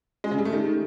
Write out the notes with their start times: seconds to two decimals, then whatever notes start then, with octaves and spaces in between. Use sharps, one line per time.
0.24 G#3
0.31 C#3
0.38 G3
0.45 A3
0.53 D#3